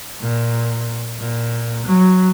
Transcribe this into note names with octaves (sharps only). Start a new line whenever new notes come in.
A#2
A#2
F#3